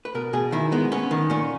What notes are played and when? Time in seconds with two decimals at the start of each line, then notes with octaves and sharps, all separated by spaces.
0.05 B4
0.15 B2 A#4
0.33 B2 G#4
0.52 D#3 E4
0.72 G#3 B3
0.92 B3 C#4
1.11 D#3
1.30 A#2 C#4